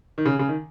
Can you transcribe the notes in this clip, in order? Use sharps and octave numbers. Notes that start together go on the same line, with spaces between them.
D#3
C#3
C#3
D#3